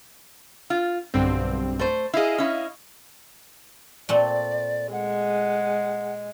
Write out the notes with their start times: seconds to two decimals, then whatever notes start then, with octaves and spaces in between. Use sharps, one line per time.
0.70 F4
1.14 B1 G2 D3 C4
1.79 A3 C5
2.14 E4 G#4 D#5 F5
2.38 C#4 E4
4.09 A#2 A3 C4 D5
4.92 G#3 F#5